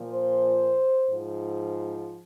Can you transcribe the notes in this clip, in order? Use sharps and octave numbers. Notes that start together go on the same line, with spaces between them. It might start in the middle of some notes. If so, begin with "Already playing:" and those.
Already playing: A#2 F3
C5
G#2 F3